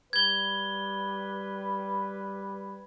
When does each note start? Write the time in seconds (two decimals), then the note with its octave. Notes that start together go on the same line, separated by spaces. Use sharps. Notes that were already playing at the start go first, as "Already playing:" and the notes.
0.13 G3 B4 G#6 G7